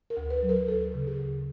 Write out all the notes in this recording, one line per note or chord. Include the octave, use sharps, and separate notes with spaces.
A#4
D2
B4
F#3
A#4
D2 A4
C#3
G#4
D2